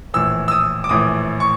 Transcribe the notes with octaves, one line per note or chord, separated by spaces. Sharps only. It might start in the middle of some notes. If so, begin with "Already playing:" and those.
A#1 A2 E3 E6
E6
D#6
D6
A#1 A2 E3 D#6
C#6